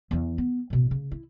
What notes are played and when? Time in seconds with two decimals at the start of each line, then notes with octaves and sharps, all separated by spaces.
0.11 E2 E3
0.38 B3
0.70 A1 B2
0.91 C#3
1.11 E4